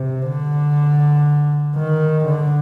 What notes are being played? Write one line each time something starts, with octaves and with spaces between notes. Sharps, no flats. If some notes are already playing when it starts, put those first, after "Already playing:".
Already playing: C3
D3
D#3
D3